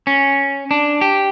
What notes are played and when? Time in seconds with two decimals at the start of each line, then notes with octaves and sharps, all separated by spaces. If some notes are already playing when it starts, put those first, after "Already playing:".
0.07 C#4
0.71 D4
1.01 G4